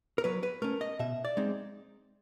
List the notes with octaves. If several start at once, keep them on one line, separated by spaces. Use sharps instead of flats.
A#4
F#3 B4
B4
A3 C#4 A#4
D#5
B2 E5
D5
G#3 C4 D#4